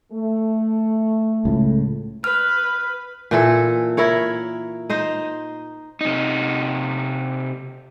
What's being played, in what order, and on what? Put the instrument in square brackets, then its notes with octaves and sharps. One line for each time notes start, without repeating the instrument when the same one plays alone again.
[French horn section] A3
[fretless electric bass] C#2 A2
[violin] B4 [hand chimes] F6
[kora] A#2 E3 A4
E4 A#4 C#5
D#4 C5 D#5
[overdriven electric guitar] C3 D#4